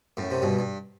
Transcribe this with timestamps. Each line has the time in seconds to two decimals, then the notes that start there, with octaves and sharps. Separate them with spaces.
0.17 F#2 A2
0.31 C3
0.42 G2 B2
0.59 G2